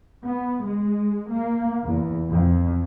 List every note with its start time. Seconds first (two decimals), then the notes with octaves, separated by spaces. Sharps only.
0.24 B3
0.64 G#3
1.31 A#3
1.83 E2
2.28 F2